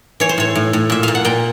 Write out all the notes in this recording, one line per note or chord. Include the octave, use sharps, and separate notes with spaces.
E3 C#5
C5
A2 C#5
A2
A2
A#2 E5
A#2 F5
F#5
A#2 G5